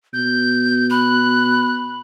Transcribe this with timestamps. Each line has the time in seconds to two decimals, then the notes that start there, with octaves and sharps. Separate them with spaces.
0.13 B2 G6
0.90 B5 F#6